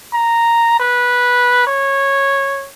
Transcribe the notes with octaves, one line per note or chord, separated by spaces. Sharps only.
A#5
B4
C#5